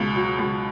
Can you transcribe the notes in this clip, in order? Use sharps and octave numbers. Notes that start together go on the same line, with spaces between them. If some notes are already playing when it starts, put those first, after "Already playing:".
Already playing: C#2 B2
F#3
C#2